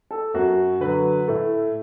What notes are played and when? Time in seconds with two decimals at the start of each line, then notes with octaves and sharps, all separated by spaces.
0.11 A4
0.34 F#2 F#4
0.81 D3 F#3 B4
1.28 A2 A3